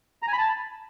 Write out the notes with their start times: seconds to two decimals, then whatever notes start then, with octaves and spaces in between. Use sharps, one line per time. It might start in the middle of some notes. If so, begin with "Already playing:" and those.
0.22 A#5
0.28 G#5
0.33 B5
0.38 A5